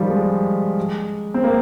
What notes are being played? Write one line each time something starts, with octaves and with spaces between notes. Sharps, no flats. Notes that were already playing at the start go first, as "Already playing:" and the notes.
Already playing: D#3 F3 G3
G#3
C4
A#3